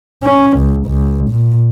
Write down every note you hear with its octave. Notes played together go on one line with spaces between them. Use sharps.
C#4
C#2
C#2
A#2